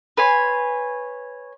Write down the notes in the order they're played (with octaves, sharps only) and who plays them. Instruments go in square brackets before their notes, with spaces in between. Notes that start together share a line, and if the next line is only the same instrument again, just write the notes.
[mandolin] B4 C#5 G#5 C6